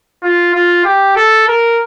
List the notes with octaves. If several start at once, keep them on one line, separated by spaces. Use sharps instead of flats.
F4
F4
G4
A4
A#4